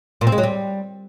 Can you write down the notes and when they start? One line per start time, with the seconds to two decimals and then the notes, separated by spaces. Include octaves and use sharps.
0.21 A#2
0.27 C4
0.32 G#3
0.38 F#3
0.43 G3